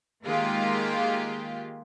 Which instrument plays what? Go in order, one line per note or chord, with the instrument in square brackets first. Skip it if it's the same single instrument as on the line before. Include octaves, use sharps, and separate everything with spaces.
[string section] D#3 G#3 A#3 F4 G4